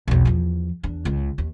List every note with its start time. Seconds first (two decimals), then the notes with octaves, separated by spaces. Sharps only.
0.08 B1 E2
0.25 E2 F3
0.83 E2 D4
1.05 C#2
1.38 D#2